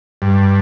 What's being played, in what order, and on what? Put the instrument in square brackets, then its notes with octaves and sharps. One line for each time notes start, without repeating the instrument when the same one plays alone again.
[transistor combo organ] G2